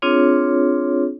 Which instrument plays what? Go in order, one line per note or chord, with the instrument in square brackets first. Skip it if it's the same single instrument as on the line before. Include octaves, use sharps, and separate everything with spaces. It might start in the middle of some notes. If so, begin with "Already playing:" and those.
[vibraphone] C4 D4 F4 G#4 C#5